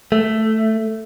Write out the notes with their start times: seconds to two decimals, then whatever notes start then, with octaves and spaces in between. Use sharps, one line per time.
0.12 A3